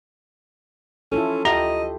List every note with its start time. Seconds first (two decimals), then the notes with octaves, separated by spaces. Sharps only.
1.12 C#4 E4 F4 A4
1.45 D2 F4 G4 D#5 E5 A#5